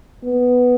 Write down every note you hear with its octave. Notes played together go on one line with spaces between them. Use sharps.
B3